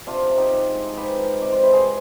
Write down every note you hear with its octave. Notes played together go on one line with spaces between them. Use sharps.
C3 D4 F4
C3
D#4 G4
G#3
G#3
F3 G4 B4
F3
C3 D5
C5
C3 B4
G#4 C5